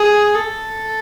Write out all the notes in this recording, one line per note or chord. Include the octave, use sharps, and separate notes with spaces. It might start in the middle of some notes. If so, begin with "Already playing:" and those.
Already playing: G#4
A4